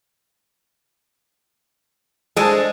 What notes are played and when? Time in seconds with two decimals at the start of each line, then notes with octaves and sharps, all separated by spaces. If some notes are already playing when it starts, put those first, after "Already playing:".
2.37 G#3 D4 A4 C5 D#5 G#5 A5